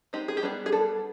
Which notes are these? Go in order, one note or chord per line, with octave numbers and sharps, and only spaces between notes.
G#3 C4 D#4 G4
G#4
G4
G3 B3 D4 G#4
G#4
G3 B3 D4 A4